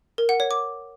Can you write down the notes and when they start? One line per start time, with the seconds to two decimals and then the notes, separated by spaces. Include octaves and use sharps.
0.18 A#4
0.29 F#5
0.40 C#5
0.51 D6